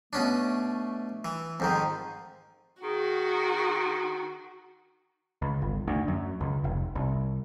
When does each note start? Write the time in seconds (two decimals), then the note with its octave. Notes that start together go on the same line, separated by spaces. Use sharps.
0.13 B2 A3 C#4 D4
1.25 E3
1.60 F2 G#2 D#3 C5
2.83 D#3 F#4 G#4
5.42 C#2
5.62 G1
5.88 D2
6.08 F#2
6.41 C#2
6.64 F1
6.95 C2